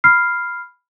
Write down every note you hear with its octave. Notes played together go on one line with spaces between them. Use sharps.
B5 F6 C7